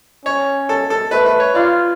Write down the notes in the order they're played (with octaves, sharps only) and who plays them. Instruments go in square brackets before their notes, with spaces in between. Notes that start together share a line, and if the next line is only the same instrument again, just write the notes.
[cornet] C#4 [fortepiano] C#5
[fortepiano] A4
A4
[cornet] A3 [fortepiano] B4
[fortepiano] B4
C#5
[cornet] F4 [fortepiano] D5